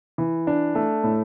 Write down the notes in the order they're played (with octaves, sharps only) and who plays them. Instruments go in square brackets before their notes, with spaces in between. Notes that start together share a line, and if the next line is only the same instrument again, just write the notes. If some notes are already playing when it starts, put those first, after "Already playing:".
[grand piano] E3
D4
A3
A2